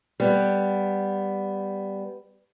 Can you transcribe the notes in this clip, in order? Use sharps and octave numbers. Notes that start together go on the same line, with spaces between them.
G3 B3